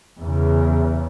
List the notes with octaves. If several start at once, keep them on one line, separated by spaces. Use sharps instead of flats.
E2 C#3